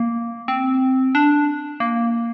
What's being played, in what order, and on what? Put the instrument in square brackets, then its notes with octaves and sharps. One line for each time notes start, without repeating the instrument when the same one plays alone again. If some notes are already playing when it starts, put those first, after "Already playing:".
Already playing: [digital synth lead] A#3
C4
D4
A#3